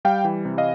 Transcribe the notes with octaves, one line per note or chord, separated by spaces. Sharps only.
G3 F5 G5
E3
C3
D#5 F5